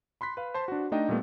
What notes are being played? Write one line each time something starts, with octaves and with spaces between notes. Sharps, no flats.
B5 C6 F#6 B6
B4 F5
C5 A5 C6
D4 F#4
A3 D4 D#4 D#5 G5
A#2 G3 A3 B3